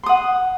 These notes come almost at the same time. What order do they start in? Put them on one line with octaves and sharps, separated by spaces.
C6 D#6 F#5